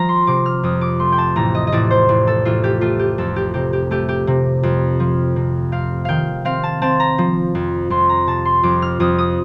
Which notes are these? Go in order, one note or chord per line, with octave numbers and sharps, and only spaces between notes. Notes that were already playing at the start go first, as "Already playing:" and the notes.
Already playing: F3 A#5
C6
C3 D6
F6
F2 D#6
D6
A3 C6
G5
A5
A1 A#5
D#5
D#5
A1 D5
C5
A1
A4
A1 F4
G4
A3 F4
G4
F2 A4
G4
C3 G4
G4
A3 G4
G4
C3
F2
F3
C3
C4 F5
D#3 F5 G5
C4 F5
A5
C4 A5
A#5
F3
F2
F2 C6
A#5
C3 A5
C6
F2 D6
F6
F2 D#6
D#6